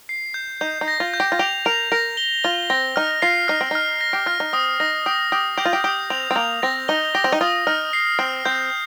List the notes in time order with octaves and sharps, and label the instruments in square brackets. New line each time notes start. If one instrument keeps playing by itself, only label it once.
[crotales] C7
G6
[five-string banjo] D#4 [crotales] G6
[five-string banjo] D#4
[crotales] A#6
[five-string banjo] F4
[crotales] G6
[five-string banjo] G4
F4
[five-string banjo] G4 [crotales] F7
[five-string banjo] A#4 [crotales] F7
[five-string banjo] A#4 [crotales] A#6
[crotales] G7
[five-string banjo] F4 [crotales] G7
[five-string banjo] C4 [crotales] A#6
[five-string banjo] D#4 [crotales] F6
[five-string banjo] F4 [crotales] C7
[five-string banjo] D#4 [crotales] F6
[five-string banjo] C4
[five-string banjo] D#4 [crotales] F6
[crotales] A#6
[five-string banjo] G4
[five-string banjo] F4 [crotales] F6
[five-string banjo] D#4
[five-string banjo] C4 [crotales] D#6
[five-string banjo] D#4 [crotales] A#6
[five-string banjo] G4 [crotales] D#6
[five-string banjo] G4 [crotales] D#6
[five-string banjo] G4 [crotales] G6
[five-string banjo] F4
G4
[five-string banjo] G4 [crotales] D#6
[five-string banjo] C4 [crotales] F7
[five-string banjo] C4
[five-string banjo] A#3 [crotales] F7
[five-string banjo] C4 [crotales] A#6
[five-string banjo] D#4 [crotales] G7
[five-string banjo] G4 [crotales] A#6
[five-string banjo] C4
D#4
[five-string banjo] F4 [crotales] D#6
[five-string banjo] D#4 [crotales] F6
[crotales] C7
[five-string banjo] C4 [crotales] F6
[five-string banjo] C4 [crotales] G6